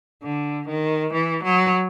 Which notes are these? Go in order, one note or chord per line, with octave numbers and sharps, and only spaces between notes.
D3
D#3
E3
F#3